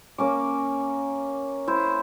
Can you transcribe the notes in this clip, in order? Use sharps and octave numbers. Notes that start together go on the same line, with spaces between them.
A#3 C#4 D6
E4 C5